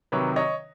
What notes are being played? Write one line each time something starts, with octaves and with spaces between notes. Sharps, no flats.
C3 D#3 F#3 B4 C#5
C#5 D#5